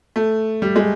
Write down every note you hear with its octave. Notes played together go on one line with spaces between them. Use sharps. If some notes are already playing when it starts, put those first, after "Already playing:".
A3
G3
G#3